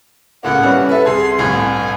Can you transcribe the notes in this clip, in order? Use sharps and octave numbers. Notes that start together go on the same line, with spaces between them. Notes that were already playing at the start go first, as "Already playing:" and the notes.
C#2 A2 A#3 F#5
E3 G3 C#4
A4 B4 E5
C2 G#4 C6 G#6
G1 C2 A2 G#5
G#5